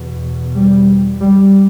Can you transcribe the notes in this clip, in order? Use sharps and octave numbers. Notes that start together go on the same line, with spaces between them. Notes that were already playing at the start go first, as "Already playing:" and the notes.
Already playing: E2 B2
G3
G3